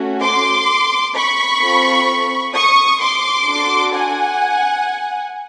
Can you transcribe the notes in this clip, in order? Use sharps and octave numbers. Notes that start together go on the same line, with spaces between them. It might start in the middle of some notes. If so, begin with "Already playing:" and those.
Already playing: A3 C#4 F#4
C6 D6
B5 C#6
C4 F4 A4
C#6 D#6
C6 D6
D4 F#4 A4
F#5 G#5